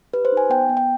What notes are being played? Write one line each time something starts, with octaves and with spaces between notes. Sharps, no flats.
G4 B4
C5
D#4
G#5
B3 G5
B3
G5